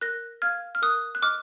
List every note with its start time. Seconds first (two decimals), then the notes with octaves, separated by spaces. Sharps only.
0.01 A#4 F#6 A#6
0.42 F5 F6 G#6
0.75 F6
0.82 A#4 D#6 F#6
1.15 F#6
1.22 D#5 D6 F6